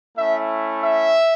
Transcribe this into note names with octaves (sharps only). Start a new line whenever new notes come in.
A3 C#4 E4 E5
E5